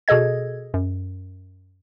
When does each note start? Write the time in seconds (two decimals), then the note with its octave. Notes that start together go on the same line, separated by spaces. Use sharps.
0.08 B2 G#4 A4 D#5 G#6
0.74 F#2